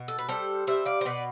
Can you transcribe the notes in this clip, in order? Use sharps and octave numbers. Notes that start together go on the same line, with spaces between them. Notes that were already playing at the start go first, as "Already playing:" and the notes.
Already playing: B2
A4
B4
G3 A4 C5
G3 C5 E5
D5 F5
C5
B2 B4 D5